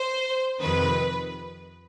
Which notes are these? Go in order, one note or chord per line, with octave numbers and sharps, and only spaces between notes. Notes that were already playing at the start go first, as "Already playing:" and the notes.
Already playing: C5
F2 C3 D#3 B4